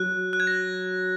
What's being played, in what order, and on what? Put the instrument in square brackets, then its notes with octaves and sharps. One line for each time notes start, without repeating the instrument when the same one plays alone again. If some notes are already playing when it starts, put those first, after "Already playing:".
Already playing: [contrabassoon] F#3 [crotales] F#6
[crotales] F#6
G#6
A#6